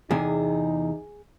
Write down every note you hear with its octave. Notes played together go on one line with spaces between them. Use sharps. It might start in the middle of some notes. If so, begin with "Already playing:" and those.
E2 C3 D#4 G#4